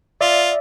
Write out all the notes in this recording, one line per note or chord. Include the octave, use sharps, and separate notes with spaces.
F4 D5 E5